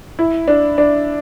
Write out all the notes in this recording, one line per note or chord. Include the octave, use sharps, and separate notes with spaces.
E4
D4
D4